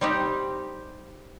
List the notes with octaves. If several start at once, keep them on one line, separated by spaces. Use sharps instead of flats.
G3 C4 D#4 G4